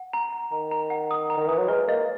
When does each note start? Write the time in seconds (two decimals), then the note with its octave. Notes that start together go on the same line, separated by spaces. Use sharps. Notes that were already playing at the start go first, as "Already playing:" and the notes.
Already playing: F#5
0.13 A#5
0.33 A#5
0.52 D#3 A#5
0.71 A#5
0.90 F#5
1.11 D#6
1.30 A#5
1.37 D#3
1.47 E3 D#6
1.58 F#3
1.68 G#3 B4
1.88 A#3 D#5